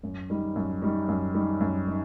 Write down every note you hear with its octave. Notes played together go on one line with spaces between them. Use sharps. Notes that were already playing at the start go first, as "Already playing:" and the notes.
F#2
D#3 G3
F#2
D#3 G3
F#2
D#3 G3
F#2
D#3